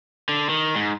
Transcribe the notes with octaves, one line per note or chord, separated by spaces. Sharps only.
D3
D#3
G#2